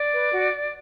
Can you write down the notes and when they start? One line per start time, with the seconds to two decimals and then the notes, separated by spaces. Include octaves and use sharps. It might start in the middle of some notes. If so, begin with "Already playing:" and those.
Already playing: D5
0.13 B4
0.32 F#4